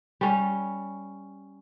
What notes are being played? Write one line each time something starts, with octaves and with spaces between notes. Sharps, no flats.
G3 C#4